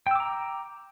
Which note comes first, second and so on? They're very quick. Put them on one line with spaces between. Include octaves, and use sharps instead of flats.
G5 E6 D6 A#5